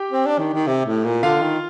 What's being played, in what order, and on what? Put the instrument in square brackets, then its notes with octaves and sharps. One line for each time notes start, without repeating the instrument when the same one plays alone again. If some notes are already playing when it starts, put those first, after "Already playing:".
Already playing: [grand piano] G4 G5
[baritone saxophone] C4
D4
D#3
D#3
C3
A2
A#2
[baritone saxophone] D3 [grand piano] F4 F5
[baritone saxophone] D#3